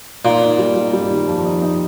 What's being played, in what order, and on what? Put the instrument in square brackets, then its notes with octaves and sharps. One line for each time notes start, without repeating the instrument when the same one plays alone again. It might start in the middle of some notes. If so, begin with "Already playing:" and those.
[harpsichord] A#2 [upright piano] D#4
[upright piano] D#4
G3
G3
G3
D#3
F2
D#4
D#4